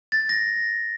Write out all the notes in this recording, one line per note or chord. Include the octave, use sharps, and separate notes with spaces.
A6
A#6